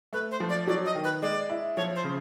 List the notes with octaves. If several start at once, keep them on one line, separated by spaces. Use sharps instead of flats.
A3 B4
C5
F3
D5
F#3 D5
D#5
D#3
B4
G#3 D5
E4
F3 C#5
C5
C#3